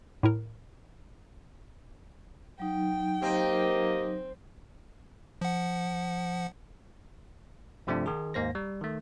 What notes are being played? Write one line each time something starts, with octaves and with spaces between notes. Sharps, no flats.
A2 E4 A#4
F#3 D#4 G5
A#3 C4 G4 D#5
F3 F#5
G2 C3 F3 A3 C4 D4
D#3 D#4 G#4
D#2 G#2 A#3 C5 A#6
G3
D#3 A3